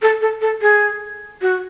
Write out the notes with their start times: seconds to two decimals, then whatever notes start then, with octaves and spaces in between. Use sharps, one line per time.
0.02 A4
0.21 A4
0.41 A4
0.62 G#4
1.41 F#4